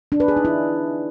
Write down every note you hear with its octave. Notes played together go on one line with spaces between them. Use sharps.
D4
B4
G#4
D#4
E4